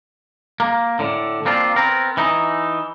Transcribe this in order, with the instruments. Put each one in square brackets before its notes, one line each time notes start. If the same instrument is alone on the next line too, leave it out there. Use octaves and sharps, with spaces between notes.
[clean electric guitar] A#3
A2 D3
F3 A#3 C4 D4 F4
B3 C4 A#4
E3 D#4